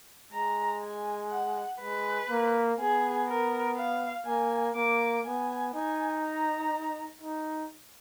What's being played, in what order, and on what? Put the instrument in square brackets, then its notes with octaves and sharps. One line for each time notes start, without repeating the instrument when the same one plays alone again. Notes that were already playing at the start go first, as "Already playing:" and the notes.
[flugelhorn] G#3 [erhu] A#5
[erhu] G#5
F#5
[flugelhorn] G#3 [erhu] B4
[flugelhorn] A#3
[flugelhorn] B3 [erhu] G#4
[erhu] A#4
F5
[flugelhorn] A#3 [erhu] G#5
[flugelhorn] A#3 [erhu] D6
[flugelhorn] B3 [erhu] G#5
[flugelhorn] D#4 [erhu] G#5
[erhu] A#5
[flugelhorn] D#4